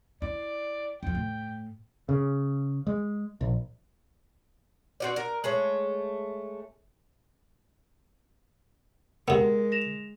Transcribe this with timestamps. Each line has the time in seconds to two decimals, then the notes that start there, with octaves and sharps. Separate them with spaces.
0.22 E4 D5
1.03 F2 F3 G5
1.15 A2
2.09 C#3
2.87 G#3
3.41 A#1
5.00 C4 F#4 D5
5.16 A#4
5.44 G#3 A3 C#5
9.28 C3 G#3 B3 A#4
9.72 A#6 E7 F7